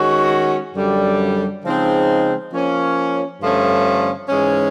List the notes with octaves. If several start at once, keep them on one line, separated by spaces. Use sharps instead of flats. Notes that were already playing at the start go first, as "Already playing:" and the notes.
Already playing: D#3 G#3 C#4 F#4
F#2 D3 G3
C#3 F3 G#3 C4 D#4
F3 A#3 C#4
G2 D3 F3 A3 C#4
G#2 E3 G#3 C#4